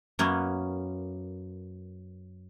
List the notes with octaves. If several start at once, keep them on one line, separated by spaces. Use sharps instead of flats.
F#2 A#3 B3 C#4